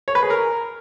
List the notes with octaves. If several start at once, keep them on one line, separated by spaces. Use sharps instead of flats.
C#5
B4
G#4
A#4